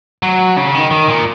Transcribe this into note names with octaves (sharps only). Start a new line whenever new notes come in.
F#3
C#3
D#3
D#3
A#2